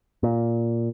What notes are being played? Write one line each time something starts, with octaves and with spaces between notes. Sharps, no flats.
A#2